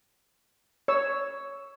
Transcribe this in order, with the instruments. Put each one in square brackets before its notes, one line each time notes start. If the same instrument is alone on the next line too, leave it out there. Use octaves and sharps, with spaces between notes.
[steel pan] C#5 E6